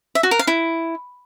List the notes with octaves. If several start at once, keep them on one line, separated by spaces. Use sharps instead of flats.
E5
F#4
A#4
F5
E4